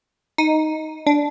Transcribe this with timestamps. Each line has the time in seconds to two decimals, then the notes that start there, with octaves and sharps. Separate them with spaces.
0.38 D#4
1.07 D4